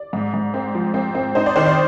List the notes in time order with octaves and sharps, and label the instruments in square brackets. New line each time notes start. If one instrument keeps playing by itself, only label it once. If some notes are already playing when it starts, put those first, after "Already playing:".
Already playing: [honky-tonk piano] D5
G#2
G#2
C4
F3
C4
C4
D#4 C5
D5
D#3 C5
D5